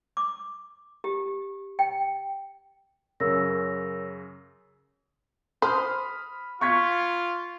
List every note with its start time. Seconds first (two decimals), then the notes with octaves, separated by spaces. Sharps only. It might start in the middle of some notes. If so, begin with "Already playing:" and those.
0.17 D6
1.04 G4
1.79 G5
3.20 F#2 C#3 A#4 E6 A#6
5.62 C5 B5 D#6 F6
6.61 F4 C#6 G#6 B6